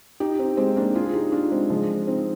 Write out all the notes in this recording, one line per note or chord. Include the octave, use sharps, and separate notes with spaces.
D#4 G4
C4 D#4
G#3 C4
A#3 D4
F4 G#4
G#4
D#4 G4
D4 F4
G#3 C4
F3 G#3
C4 D#4